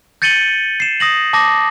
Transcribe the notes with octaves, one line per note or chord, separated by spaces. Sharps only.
G6 A6 C#7 D#7 F#7 G7
C7 E7
D#6 A#6 F#7
A5 D6 D#6 A#6